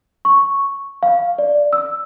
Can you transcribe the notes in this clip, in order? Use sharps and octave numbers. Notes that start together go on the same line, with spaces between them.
C#6
F5
D5
E6